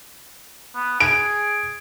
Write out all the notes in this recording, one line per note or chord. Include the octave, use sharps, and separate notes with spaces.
B3
G#4 D7